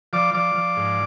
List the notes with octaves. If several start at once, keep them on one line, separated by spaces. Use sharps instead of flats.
F3 D5 D6
F3 D5 D6
F3
G#2